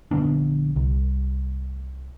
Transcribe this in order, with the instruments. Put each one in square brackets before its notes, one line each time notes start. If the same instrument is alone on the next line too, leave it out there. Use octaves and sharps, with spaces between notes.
[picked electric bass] A#1 D3 B3 D4
C2